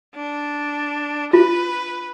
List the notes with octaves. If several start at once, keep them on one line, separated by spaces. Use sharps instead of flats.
D4
F4 B4